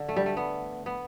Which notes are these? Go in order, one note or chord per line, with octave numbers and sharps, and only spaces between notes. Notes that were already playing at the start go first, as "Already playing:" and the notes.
Already playing: D3
A3
G3
A3
B3
B3